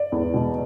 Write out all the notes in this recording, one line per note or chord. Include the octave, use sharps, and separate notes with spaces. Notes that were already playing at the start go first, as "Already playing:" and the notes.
Already playing: D5
E2
B2